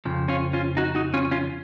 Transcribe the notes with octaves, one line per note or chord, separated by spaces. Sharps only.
F2 C#3 F3
C#4 F4
C#4 F4
D#4 F#4
D#4 F#4
C#4 F4
C#4 F4